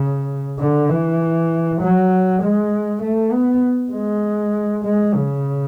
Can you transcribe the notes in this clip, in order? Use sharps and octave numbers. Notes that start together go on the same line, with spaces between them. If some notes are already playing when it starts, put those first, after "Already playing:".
Already playing: C#3
D3
E3
F#3
G#3
A3
B3
G#3
G#3
C#3